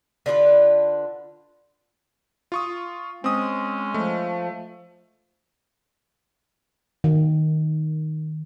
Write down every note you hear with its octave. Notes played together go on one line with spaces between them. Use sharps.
D3 F4 G4 B4
F4 C#6 D#6
G#3 C4 C#4 D#6
F3 A3
D#3